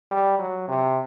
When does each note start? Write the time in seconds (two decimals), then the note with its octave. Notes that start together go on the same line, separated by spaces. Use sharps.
0.11 G3
0.39 F#3
0.68 C3